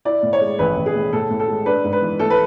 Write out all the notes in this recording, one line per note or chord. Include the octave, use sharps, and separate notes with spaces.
E4 D5
A2
C#5
G#3
A1 B4
A1
G#4
A2
A2 A4
A2
A4
G#3
D4 B4
G#2
B4
E3
A3 A4
B4